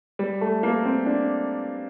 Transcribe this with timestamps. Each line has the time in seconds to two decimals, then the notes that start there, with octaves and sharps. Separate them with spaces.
0.19 G3
0.41 A3
0.63 A#3
0.85 C4
1.06 D4